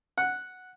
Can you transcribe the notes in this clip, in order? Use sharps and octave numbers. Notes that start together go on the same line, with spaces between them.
F#5